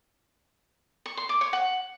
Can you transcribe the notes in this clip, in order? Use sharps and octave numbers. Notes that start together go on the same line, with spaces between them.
C#6
C6
D6
C#5
F#5